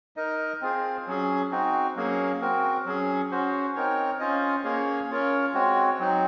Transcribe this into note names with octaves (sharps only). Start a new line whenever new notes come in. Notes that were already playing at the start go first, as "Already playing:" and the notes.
D#4 A#4 D#5
C4 F4 G#4 C5
F#3 C#4 G#4
C4 D#4 F#4
F#3 A#3 C#4 G#4
C4 F#4 A#4
F#3 C#4 G#4
C#4 F#4 C5
C4 D#4 A#4 C#5
C#4 F4 C5 D#5
A#3 C#4 G#4 C#5
C#4 F4 A#4 C#5
G#3 C4 F#4 C#5
F#3 C4 D#4